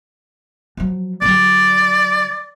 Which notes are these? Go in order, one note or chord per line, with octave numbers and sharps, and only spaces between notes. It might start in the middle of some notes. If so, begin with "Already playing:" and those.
F3 F#3
D3 F#3 D5